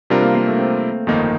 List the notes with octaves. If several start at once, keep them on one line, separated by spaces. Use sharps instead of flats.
C3 G3 C4 D4 F4 A#4
A#3
A#3
A3
C4
G1 F2 D#3 A#3 D#4